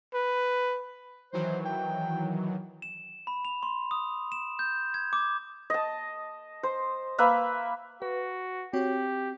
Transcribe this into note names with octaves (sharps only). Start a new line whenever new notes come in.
B4
D#3 E3 F#3 C5
G5
E7
B5
F7
C6
D#6
E7
G6
G#6
D6
D#5 A5
C5
A#3 B4 E5 B5
F#4 B4
C4 F#4 G4 C#5